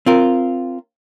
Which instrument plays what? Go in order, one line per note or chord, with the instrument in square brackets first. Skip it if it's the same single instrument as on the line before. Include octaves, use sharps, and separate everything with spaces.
[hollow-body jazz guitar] C4 F4 A#4